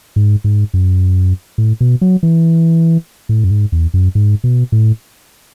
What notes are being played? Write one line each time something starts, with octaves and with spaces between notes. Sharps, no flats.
G#2
G#2
F#2
A2
B2
F#3
E3
A2
F#2
G#2
E2
F#2
G#2
B2
A2